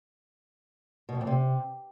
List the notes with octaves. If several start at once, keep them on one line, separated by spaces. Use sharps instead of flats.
B2
F2
A#2
C3